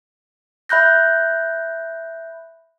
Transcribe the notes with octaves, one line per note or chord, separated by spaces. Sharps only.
E5 B5 F#6 G6 A#6